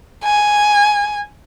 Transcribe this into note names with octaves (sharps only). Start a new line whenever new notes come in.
G#5